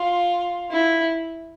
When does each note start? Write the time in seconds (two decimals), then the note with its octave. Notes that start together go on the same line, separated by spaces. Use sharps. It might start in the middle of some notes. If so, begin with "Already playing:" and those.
Already playing: F4
0.71 E4